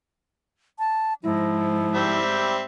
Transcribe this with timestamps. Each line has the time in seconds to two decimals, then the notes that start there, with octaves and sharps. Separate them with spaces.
0.79 A5
1.23 G#2 F3 E4
1.95 G3 C4 E5